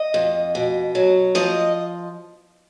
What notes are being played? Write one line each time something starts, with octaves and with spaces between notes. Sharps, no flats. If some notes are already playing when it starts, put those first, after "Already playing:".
Already playing: D#5
F2
B2
F#3
F3 D#5